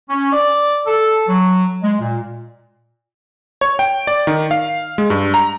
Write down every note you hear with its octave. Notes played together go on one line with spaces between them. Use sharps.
C#4
D5
A4
F#3
G#3
A#2
C#5
G5
D5
D#3
F5
G#3
G2
A#5